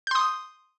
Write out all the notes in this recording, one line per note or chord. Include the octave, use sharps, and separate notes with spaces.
C6 D#6 G6